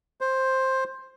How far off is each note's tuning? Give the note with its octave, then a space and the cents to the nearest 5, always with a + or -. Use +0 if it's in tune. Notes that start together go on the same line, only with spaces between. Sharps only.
C5 +10